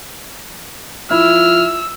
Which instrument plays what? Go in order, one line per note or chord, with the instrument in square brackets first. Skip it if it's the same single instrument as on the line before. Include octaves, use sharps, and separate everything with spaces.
[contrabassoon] F3 [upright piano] E4 [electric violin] E6 [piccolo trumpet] F6